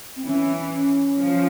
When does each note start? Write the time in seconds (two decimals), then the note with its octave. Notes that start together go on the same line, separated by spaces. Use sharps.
0.16 C4
0.25 E3 C#4
0.72 C#4
1.18 F3